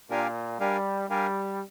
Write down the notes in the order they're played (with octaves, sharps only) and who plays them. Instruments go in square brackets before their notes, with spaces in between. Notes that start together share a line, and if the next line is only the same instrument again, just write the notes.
[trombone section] A#2 [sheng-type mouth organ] D4 G4 A#4 F5 G#5
[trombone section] G3 [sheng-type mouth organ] D4 G4 A#4 F5 G#5
[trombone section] G3 [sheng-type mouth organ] D4 G4 A#4 F5 G#5